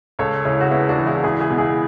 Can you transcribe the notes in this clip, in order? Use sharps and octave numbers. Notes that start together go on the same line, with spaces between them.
C#2 A4 C#5
C#3 C#4 E4
F#4
B3 C#4 E4
D4 F#4
E3
E4 G#4
F#4
C#2 E4 G#4
E4 G#4
B2
E4 G#4